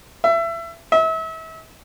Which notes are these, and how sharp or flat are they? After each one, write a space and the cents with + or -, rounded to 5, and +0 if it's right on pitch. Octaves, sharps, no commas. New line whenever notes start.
E5 +25
E5 -35